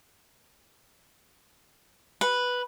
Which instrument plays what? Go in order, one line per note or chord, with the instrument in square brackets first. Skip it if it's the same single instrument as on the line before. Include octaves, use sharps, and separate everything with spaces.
[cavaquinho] B4